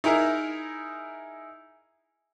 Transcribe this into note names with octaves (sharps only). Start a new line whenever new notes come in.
D#4 E4 G#4 A#4 E5